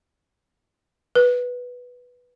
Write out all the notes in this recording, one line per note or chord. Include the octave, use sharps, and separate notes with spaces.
B4